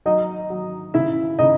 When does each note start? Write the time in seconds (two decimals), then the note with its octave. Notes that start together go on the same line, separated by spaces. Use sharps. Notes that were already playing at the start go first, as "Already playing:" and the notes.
0.06 F#3 D#4 D#5
0.50 F#3
0.94 C#3 E4 E5
1.39 C#3 D#4 D#5